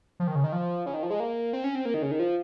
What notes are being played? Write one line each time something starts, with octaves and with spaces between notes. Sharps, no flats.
F3
D#3
C#3
D#3
F3
C#3
D#3
F3
G#3
A#3
C4
C#4
C4
A#3
D#3
C#3
D#3
F3